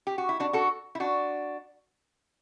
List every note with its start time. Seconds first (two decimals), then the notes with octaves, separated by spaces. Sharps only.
0.07 G4
0.18 F#4
0.29 E4
0.40 D4 F#4
0.53 F#4 A4
0.95 E4
1.00 D4 F#4